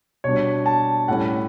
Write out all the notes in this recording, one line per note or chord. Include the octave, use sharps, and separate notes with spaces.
B2 G3 D4 C#5
A5
A2 G3 C#4 F#5